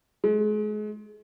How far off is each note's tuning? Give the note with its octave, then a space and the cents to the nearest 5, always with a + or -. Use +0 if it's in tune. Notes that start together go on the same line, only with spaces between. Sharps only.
G#3 +35